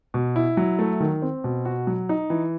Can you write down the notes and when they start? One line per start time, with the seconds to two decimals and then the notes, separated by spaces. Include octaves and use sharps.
0.14 B2
0.36 E4
0.57 F#3
0.79 A3
1.00 D#3
1.22 C4
1.44 B2
1.65 F#4
1.87 F#3
2.09 D#4
2.30 E3